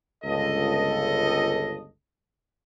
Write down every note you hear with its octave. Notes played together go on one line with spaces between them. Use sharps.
G1 C#2 A4 D#5